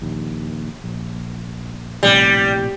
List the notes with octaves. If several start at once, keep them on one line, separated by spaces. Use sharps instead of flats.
A#1 D#2
A#1
A#1 A2 C3 G3